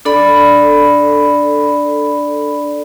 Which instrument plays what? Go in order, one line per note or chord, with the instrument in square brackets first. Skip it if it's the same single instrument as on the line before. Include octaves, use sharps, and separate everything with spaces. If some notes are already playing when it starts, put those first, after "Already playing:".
[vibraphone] D4 A4 D5 B5